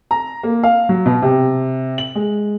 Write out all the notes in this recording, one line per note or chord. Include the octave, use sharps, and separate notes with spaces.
A#5
A#3
F5
F#3
B2
C3
F#7
G#3